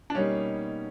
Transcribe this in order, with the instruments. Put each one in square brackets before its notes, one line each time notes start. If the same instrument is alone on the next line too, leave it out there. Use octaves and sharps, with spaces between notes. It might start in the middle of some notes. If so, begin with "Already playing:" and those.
[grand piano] D4
[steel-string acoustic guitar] B2 G3 A#3 D#4 [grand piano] C#4